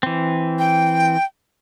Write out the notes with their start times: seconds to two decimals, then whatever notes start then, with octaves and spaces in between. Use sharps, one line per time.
0.03 E3 C4
0.59 G5